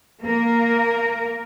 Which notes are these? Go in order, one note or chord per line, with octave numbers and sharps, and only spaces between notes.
A#3 A#4